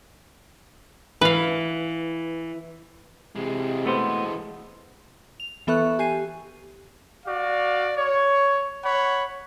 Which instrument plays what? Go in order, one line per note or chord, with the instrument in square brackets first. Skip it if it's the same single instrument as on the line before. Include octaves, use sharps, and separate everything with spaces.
[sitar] E3 [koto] B4 F5
[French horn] C3 [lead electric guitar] E3 G#3
[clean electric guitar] A3 B3 C5
[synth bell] F7
E3 B3 A4 E5 C#6 F#6
G4 G#5 C7 D#7
[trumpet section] F#4 D5 F5
C#5
C#5 F#5 B5